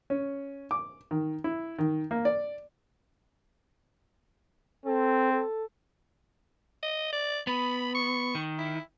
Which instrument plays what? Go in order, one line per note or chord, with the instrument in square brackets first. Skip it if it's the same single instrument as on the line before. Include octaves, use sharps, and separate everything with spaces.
[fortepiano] C#4
D6
D#3
E4
D#3
A#3
D5
[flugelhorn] C4 [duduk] A4
[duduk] A4
[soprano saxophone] D#5
D5
[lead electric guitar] B3 [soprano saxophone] B5
[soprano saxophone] C#6
[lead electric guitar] D#3
[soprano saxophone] E4